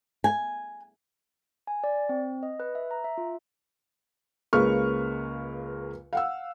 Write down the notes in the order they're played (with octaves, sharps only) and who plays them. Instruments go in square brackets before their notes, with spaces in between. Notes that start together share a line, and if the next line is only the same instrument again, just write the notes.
[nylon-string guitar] G#5
[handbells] G#5
D5
C4
D#5
B4
E5
A#5
E5
F4
[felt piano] C#2 C#3 A#3 B4 C#6 F6
F5 F#5 E6